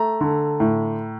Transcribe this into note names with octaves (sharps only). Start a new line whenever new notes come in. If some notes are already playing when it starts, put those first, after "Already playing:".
Already playing: A3 A#5
D3
A2